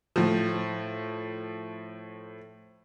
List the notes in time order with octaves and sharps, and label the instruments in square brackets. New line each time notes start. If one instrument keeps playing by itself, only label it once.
[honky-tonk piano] A2 F3